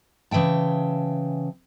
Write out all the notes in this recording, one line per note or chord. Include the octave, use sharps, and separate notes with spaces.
C#3 E3 E5 G5 A5